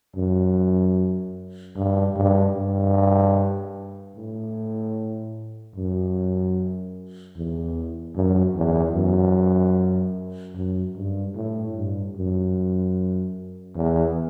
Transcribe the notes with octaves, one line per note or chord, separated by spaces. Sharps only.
F#2
G2
G2
G2
A2
F#2
E2
F#2
E2
F#2
F#2
G2
A2
G2
F#2
E2